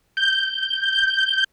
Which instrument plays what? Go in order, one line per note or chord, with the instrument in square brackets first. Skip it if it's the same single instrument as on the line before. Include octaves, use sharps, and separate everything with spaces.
[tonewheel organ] G6